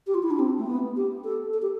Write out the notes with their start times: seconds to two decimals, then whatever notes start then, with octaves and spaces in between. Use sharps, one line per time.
0.07 G4
0.14 F4
0.23 E4
0.31 D4
0.39 C4
0.58 A3
0.67 B3
0.96 G4
1.24 A4
1.53 A4
1.62 G4